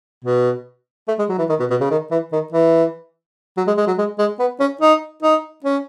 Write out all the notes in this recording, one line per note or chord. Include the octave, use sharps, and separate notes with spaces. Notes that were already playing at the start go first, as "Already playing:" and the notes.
B2
A3
G#3
F#3
E3
D#3
B2
B2
C#3
D#3
E3
D#3
E3
F#3
G#3
G#3
F#3
G#3
G#3
B3
C#4
D#4
D#4
C#4